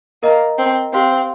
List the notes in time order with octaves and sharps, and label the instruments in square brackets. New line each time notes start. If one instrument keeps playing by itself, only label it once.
[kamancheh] A#3 [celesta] A#4 D#5 A#5
[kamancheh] C4
[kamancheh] C4 [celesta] G4 C5 F5 C6